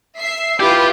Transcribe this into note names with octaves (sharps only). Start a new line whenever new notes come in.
E5 C7
E4 F4 G4 B4